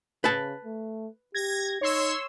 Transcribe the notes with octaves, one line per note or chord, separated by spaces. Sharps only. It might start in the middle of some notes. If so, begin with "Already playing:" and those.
C#3 B4 A5
A3
G4 G#6 A#6
D#4 C#5 C6 E6